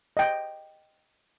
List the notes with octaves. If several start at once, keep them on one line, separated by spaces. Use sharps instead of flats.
D#5 G5